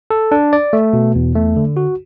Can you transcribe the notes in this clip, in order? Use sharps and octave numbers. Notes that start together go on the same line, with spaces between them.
A4
D4
D5
A3
B2
E2
A3
D3
F#4